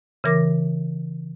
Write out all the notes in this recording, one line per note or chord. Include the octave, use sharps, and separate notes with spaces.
C#3 E3 A#4 D6 A#6